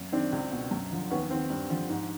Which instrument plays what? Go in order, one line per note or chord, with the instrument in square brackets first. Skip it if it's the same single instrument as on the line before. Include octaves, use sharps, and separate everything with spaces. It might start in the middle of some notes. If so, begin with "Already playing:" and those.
Already playing: [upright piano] F#2
D#3 C4 D4
C#2
B2
F#2
D3 F3
D#2 B3 C#4
D#3 C4
G2
D3 F3
G#2